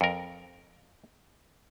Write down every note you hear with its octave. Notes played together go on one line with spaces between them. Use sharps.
F2 A#4